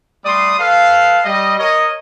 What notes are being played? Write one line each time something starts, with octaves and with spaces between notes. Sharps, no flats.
G3 A3 D5 C6 D#6
A4 B4 F5
G3 D#5
A#4 C#5 D#5